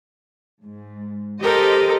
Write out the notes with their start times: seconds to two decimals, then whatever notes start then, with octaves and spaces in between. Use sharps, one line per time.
0.62 G#2
1.42 G4 A4 A#4 C5 D#5